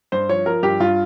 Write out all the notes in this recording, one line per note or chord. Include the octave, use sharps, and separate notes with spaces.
G2 C5
F3 C#5
F3 A#4
G2 G4
G2 F4